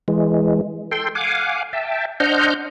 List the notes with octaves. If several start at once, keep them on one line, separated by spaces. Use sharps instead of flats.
E3 G#3
A4 G5 C6
F5 F#5 G#5 D6
E5 G5 A5
D4 C5 D#5 F#5 F6 G6